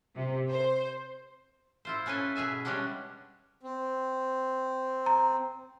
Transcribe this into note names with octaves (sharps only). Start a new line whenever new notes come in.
C3
C5
E4 F4 C5
B3 C#4 A4 B4 G#5
B2 G#4 E5 G#5
G3 G#3 C#4 D4 F#4
C4
A#5